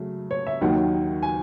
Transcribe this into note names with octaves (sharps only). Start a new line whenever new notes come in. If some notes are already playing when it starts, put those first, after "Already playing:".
Already playing: C#3 F#3 A3
C#5
E5
D#2 D#3 F#3 F#5
G#5